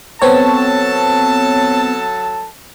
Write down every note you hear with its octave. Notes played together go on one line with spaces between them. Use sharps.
F#3 B3 C4 A4 C#5 A5